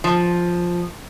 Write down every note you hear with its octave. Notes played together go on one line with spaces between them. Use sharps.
F3